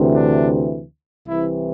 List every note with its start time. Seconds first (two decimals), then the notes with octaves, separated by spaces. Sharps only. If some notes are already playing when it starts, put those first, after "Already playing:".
Already playing: D2 C3 E3
0.14 D4
1.27 C2 C3 E3 E4